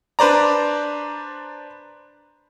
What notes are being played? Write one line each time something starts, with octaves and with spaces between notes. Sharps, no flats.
D4 B4 C5 D5 A#5